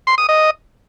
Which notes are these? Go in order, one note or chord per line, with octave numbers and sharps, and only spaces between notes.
C6
D#6
D#5